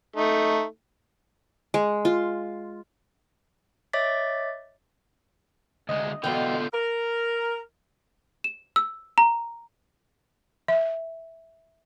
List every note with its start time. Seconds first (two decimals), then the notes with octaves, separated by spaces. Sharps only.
0.16 A3 D#4
1.74 G#3
2.05 F4
3.93 C#5 D#5 E5 D6 A6 B6
5.89 D2 G#3 D#5
6.24 B2 D3 E3 B3 F4 A4 G5 G6
6.74 A#4
8.44 E7
8.76 E6
9.18 A#5
10.68 E5